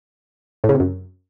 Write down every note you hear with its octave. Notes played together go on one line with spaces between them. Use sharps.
A2
C#3
C3
F#2